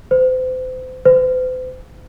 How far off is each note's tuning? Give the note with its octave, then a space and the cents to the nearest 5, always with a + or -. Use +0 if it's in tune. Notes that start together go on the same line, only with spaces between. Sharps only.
C5 -35
C5 -45